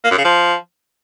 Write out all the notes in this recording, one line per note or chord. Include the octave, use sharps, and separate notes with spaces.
A#3
F#2
C#3
F3